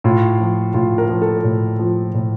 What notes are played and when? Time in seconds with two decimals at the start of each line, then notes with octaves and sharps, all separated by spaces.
0.04 A2 F4
0.40 F3
0.74 A2 F4
0.98 A#4
1.09 F3
1.22 A4
1.44 A2
1.79 F3
2.14 A2